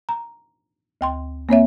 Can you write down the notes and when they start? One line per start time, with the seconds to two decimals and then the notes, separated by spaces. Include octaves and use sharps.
0.09 A#5
1.01 D2 G5 C6
1.49 A#3 C4 C#5 E5